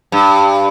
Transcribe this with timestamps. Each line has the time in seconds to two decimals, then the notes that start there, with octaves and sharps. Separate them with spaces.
0.12 G2